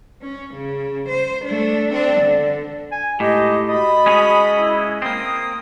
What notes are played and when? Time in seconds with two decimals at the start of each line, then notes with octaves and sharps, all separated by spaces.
0.22 C#4
0.55 C#3
1.09 C5
1.44 A3 D4
1.91 C4 D4
2.20 D3
2.92 G#5
3.20 A2 G#3 D#4 G4 D#5
3.69 F#4 D#5 A5 B5
4.06 G#3 C#4 G#4
4.59 E4
5.02 A#3 C4 D#6